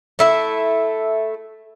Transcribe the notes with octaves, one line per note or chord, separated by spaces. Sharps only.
A3 E4 E5